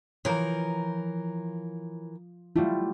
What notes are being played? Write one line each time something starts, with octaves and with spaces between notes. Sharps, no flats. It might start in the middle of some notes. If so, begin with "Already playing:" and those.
E3 F3 A#4 C#5 A#5
F#3 G3 A3 E4 F4